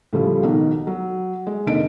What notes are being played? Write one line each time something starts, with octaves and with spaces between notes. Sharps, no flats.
A2 C#3 F3 G3
B1 B2 D#3
F#3
G#3
F1 D#3 A#3 D4 D#5 D7